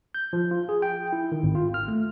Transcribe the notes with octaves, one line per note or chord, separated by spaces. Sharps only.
G6
F3
F4
G#4
G5
E4
D#3
G#1
F4
F6
A3